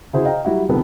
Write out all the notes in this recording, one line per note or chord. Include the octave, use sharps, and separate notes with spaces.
C#3 E4 F#4 G#4 C5
D#5 F5 G5 A#5
F#3 G3 E4 F#4
C2 A#2 D#3 B3 A4